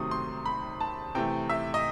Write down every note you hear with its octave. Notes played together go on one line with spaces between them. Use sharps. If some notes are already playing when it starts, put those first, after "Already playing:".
Already playing: C3 D#3 F#3 A3 C4 D#6
C6
B5
A5
C3 E3 A3 G5
E5
D#5